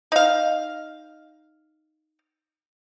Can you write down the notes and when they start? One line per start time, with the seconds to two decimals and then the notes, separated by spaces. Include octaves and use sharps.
0.12 D#4 F5